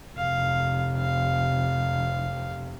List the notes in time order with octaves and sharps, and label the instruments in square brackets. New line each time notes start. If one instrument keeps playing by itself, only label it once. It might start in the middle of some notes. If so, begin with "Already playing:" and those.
[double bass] F1 C3 [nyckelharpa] F5
[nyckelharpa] F5